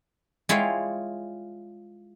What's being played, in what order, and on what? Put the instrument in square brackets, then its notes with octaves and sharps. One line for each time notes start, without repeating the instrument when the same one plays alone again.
[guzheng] G#3 E4 F4 C#5 F5 G5